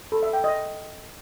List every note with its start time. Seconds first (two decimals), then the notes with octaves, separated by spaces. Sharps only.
0.12 A4
0.23 E5
0.33 G5
0.44 D#5